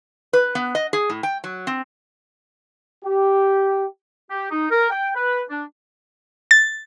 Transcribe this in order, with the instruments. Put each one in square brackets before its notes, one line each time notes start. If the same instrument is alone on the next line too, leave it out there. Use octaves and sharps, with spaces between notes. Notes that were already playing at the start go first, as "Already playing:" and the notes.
[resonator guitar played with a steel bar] B4
B3
D#5
G#4
A2
G5
F#3
C4
[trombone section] G4
[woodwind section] G4
D#4
A#4
G5
B4
D4
[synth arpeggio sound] A6